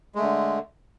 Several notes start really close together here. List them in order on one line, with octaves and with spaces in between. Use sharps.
G#3 A3 D3